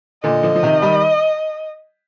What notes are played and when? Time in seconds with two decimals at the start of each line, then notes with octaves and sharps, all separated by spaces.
0.23 A#2 D3 D#5
0.43 D3 F3
0.56 F3
0.63 C3 D#3
0.82 D#3 G3